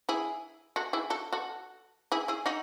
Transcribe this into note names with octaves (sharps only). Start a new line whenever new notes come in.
E4 G#4
F#4 A4
E4 G#4
F#4 A4
F#4 A4
E4 G#4
E4 G#4
D#4 F#4